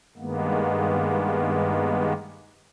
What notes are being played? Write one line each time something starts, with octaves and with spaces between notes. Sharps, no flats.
G2 D#3 G#3 A#3 B3